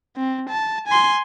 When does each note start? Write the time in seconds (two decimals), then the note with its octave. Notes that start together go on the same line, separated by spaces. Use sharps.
0.17 C4
0.49 A5
0.87 G#5 C6